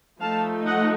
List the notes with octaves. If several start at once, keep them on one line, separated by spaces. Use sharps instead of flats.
F3 A3 D#4 F5 A5
D#5 F#5